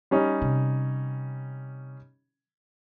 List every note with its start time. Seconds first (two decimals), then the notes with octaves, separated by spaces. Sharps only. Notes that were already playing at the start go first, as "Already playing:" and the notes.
0.11 G3 C#4 D#4
0.42 C3